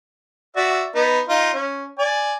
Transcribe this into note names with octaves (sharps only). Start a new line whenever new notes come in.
F#4 D5 E5
B3 D#4
D#4 F4
C#4
D5 G#5